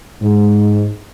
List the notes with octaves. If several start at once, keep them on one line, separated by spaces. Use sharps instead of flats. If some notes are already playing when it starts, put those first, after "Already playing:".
G#2